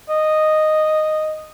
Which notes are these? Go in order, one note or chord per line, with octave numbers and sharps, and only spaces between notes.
D#5